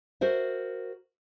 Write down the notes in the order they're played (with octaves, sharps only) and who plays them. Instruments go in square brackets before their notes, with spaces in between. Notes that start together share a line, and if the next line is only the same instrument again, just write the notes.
[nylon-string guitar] F#4 A#4 C5 E5